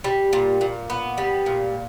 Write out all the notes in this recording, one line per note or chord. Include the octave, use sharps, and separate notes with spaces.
G3
A#2
A#2
B3
G3
A#2